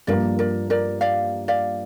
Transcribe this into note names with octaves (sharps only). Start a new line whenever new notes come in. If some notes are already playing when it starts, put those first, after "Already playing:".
G2 F3 A#3 F4 A#4 D5
A#4 D5
A#4 D5
D5 F5
D5 F5